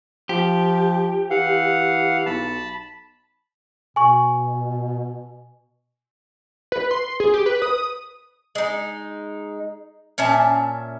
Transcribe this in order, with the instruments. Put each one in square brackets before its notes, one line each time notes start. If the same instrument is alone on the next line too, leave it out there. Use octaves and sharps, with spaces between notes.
[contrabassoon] F3 [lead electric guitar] G4
[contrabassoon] E3 [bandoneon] F5 F#5
[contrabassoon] B1 [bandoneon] A5 B5
[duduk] B2 [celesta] G#5 C#6
[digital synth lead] B4
C6
G#4
G4
B4
D#6
[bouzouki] G#3 D#4
A#2 C#4 E5 A5